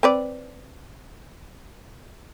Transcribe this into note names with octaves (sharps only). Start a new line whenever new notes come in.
C4 B4 D5